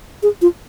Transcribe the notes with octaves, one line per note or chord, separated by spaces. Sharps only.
G#4
F4